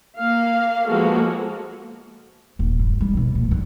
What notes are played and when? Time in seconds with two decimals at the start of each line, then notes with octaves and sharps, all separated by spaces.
0.19 A#3 F5
0.87 F3 G#3 A#3 B3 F#4 A4
2.59 D#1
2.79 G2
3.01 G3
3.13 D#2 B2
3.35 A#2
3.48 E1 D3